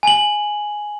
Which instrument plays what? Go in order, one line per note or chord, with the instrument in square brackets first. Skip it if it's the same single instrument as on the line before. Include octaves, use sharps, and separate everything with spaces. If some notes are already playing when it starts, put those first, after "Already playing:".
[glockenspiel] G#5 F#7